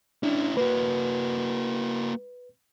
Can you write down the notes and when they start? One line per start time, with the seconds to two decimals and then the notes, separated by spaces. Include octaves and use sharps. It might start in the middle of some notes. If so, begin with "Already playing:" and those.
0.23 C#4 D4 E4
0.57 A#3 F#4 B4